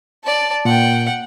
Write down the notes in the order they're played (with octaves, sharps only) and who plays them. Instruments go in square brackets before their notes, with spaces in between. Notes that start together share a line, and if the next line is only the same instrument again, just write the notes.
[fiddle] D5 A5
[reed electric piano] A#2 [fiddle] F#5 G5